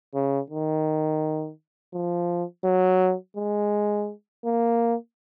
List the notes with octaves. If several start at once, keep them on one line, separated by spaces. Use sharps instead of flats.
C#3
D#3
F3
F#3
G#3
A#3